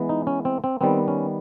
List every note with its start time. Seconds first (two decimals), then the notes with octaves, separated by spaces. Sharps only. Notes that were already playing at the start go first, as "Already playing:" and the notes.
Already playing: E3 G#3 B3
0.09 D#4
0.27 C#4
0.45 C4
0.64 C4
0.81 D#3 G3 B3 C4
1.08 C#4